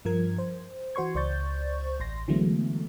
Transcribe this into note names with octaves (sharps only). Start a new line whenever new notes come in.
G2 F3 A#4 G#6
C5
E3 F#4 C5 C6 C#6 G#6
C#2 C5 D5 C#6 G6 A6
A1 C6 A#6
D3 E3 F#3 G#3 A3 B3